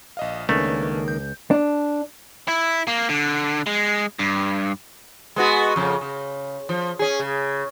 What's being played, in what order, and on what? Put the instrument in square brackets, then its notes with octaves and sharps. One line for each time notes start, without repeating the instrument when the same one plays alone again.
[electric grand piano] A#1 D#5 F5
[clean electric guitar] C#2 [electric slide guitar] D#3 A#3 [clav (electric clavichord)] A3 [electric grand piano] C#4 D4 B4
[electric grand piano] G6
[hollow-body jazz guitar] D4
[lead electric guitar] E4
A#3
D3
G#3
G2
[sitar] G#3 B3 F#4
F2 C#3
C#3
F3
C#4 G#4
C#3